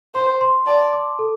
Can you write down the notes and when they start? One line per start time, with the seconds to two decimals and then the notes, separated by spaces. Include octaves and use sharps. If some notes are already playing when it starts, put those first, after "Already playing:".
0.15 C5 C6
0.41 C6
0.67 D5 A5
0.93 D6
1.19 A4